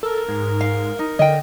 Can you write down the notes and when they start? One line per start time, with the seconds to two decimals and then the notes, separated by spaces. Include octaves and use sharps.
0.03 A4 A#4
0.28 G#2
0.61 F5
0.99 D#4
1.19 D3 D#5 G5